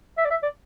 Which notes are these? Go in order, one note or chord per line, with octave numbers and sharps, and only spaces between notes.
E5
D5
E5
D5